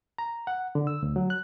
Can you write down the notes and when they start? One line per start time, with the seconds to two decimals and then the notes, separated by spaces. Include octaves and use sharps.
0.18 A#5
0.47 F#5
0.75 D3
0.87 E6
1.03 D2
1.16 F#3
1.30 F#6